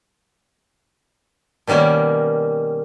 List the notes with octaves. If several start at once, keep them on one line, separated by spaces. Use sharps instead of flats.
B2 D#3 G3 A#3 C#4